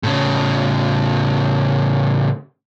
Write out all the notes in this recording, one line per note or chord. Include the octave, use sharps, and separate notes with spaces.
A2 C#3